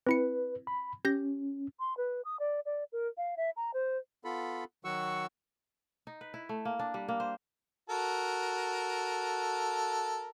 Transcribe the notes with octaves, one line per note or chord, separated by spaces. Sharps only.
C4 E4 B4 C#7
B5
C#4 G4 G6 A#6
C6
B4
D#6
D5
D5
A#4
F5
E5
A#5
C5
B3 F4 A4 B5
D#3 F#3 F#4 F#5 C#6 E6
D#4
B4
E4
A3
A#3
D4
G3
A#3
C5
F#4 A4 A#4